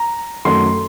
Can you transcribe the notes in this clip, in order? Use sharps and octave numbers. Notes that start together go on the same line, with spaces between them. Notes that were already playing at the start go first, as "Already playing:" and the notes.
Already playing: A#5
F#2 D#3 F#3 A3 C6